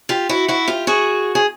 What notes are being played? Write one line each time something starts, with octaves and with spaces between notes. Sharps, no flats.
F4 G4
E4 F#4
E4 F#4
F4 G4
F#4 G#4
G#4